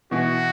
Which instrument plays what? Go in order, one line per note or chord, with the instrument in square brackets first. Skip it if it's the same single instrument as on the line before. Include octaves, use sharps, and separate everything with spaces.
[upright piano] B2 E3 [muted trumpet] F#4